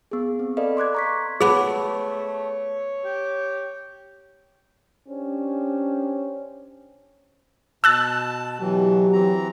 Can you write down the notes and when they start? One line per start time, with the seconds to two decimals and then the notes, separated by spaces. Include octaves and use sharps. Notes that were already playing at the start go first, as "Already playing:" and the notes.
0.11 B3 G#4
0.39 C4
0.57 A4 B4 D5 D#5 F5
0.77 C6 D6 F#6 G#6
0.94 A#5 C#6 B6
1.41 A3 B3 G#4 C#5 F#5
3.04 G4
5.08 C#4 D4 G4 C5 C#5
7.84 B2 A5 E6 F#6 A6
8.60 B2 E3 F#3 G4
9.12 E3 C4 A#5